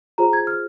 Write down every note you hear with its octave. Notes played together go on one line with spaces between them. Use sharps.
F4 G#4 C5 A#5
G#6
F6